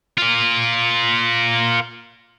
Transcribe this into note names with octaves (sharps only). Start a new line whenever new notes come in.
F4 A#4